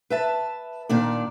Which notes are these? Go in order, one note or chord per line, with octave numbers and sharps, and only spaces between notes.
B4 E5 A5
A#2 D#3 D4 D5